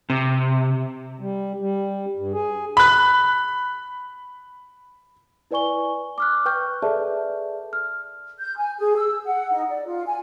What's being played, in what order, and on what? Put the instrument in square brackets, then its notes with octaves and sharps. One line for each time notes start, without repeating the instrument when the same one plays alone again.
[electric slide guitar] C3
[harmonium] G3
G3
G2
G#4
[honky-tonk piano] B5 F#6
[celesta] E4 B4 D5 G#5 C#6 G7
D6 F6 F#6
B4 G5 C#6 F6 G6
G#4 A4 B4 D5 E5 A5
F6
[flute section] G6
G#5
G#4
E6
F#5
D#4
D5
F4
G#5